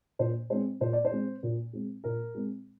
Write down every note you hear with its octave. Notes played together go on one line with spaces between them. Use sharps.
A#2 C5
G#3 C4 C5
A#2 C5
D5
C5
G#3 C4
A#2
G#3 C4
A#2 A#4
G#3 C4